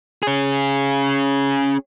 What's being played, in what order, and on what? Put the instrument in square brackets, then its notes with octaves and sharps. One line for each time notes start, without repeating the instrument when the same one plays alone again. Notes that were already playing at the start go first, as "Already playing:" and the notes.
[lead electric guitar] C#4 G#4